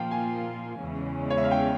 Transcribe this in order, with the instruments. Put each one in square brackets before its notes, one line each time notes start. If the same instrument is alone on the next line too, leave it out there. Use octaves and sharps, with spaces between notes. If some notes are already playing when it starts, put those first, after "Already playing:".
Already playing: [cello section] A#2 F3 A#3 F4 [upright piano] F5 G5
[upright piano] G#5
[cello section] E2 C#3 E3 G#3 C#4
[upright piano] C#5
E5
F5
G5